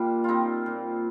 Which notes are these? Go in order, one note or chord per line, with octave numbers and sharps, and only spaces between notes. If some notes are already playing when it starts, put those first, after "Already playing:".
Already playing: A#2 G3 A#3 D4
G3 C4 D#4 F4
A#2